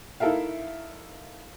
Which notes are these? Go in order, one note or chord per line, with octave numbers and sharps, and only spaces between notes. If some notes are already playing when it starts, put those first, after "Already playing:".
D#4 E4 A4 A#4 E5 F5